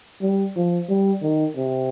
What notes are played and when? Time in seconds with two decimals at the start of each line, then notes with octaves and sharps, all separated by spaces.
0.21 G3
0.56 F3
0.89 G3
1.22 D#3
1.56 C3